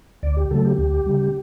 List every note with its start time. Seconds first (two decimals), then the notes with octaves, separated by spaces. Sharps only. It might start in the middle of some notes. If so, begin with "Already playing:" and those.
0.23 D2 D5
0.36 G4
0.51 C#3 F#3 A3 A4
0.65 G4
0.78 D2
1.06 C#3 G3